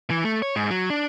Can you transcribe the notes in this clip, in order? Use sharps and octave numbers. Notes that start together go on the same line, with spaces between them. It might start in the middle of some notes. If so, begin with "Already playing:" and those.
E3
A3
C#5
G#2
F#3
D4